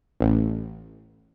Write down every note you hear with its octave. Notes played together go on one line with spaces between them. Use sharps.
A1